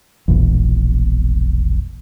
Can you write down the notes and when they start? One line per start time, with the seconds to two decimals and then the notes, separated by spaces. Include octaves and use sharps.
0.28 E1 A#1 E2